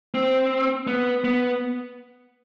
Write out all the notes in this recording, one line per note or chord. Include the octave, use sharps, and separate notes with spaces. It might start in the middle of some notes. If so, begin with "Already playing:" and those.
C4
B3
B3